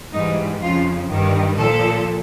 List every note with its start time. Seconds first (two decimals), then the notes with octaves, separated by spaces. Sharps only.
0.14 G#2 E3 G3 D#4
0.61 F2 C#3 F3 F4
1.10 G2 D#3 G3
1.58 A#2 F3 A4